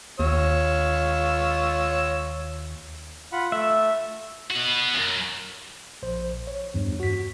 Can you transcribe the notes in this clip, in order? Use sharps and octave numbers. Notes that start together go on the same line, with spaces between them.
D#2 F4 C#5 E6
F4 F#5 B5
A3 E5
B3 F#4
C#2 F#2
A#1 C5
C#5
E2 G2
F#4 B6